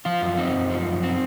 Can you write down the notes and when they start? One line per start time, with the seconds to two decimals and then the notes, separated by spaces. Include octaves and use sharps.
0.05 F3 F4
0.22 F#2
0.38 C4 D#4
0.55 F#2
0.70 F3
0.87 F#2
1.03 C4